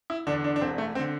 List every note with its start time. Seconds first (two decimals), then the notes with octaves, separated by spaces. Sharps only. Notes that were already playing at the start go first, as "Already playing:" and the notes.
0.10 E4
0.27 E2 D3 D4
0.44 D4
0.56 D4
0.61 E1 C4
0.78 A3
0.95 C4
0.99 D3